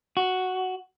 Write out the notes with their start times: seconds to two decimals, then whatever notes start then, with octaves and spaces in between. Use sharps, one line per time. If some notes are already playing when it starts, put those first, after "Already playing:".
0.17 F#4